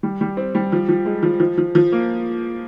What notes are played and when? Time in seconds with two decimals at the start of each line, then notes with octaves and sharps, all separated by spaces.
0.03 G3
0.21 G3
0.37 C4
0.55 G3
0.72 F3
0.89 F3
1.06 G#3
1.23 F3
1.40 F3
1.58 F3
1.75 F3
1.92 A#3